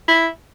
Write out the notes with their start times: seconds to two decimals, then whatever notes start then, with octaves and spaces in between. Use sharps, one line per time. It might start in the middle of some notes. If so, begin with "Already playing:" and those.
0.08 E4